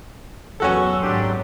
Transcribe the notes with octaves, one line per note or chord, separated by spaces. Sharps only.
E2 F#3 B3 C#4 F#4 A4 C#6 E6
G#1 F#2 A2 D4 G4 C6